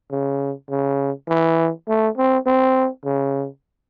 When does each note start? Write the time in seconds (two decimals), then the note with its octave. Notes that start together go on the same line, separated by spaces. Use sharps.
0.11 C#3
0.70 C#3
1.29 E3
1.88 A3
2.17 C4
2.47 C4
3.05 C#3